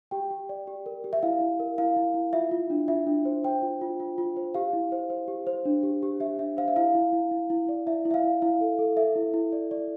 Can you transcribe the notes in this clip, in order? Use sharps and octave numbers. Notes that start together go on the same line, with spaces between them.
G4 G5
G4
D5
G4
A#4
G4
E5
E4 F5
E4
A#4
E4 F5
E4
E4
F4 E5
F4
D4
F4 E5
D4
C5
C5 G5
F4
F4
F4
F4
C5
G4 F5
E4
C5
C5
G4
C5
D4
G4
G4
G4 E5
D4 E5
C5 F5
E5
E4 F5
E4
E4
E4
E4
D5
E4 E5
E4
E5
F5
E4
E4 F5
A4
A4
A4 E5
E4
E4
D5
D5